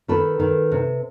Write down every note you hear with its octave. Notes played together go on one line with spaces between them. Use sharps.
D#3 A4 B4
D#3
C3